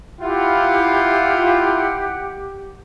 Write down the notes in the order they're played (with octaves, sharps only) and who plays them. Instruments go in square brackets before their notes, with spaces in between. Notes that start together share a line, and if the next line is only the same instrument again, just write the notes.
[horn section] E4 F4 [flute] G4 [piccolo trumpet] F#5